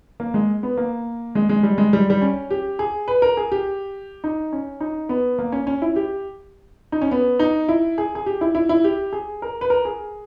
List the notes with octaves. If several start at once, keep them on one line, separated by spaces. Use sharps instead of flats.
A#3
G#3
B3
A#3
G#3
G#3
G3
G#3
G3
G3
C#4
G4
G#4
B4
A#4
G#4
G4
D#4
C#4
D#4
B3
A#3
C#4
C#4
E4
G4
D#4
C#4
B3
D#4
E4
G#4
G#4
G4
E4
E4
E4
G4
G#4
A#4
B4
A#4
G#4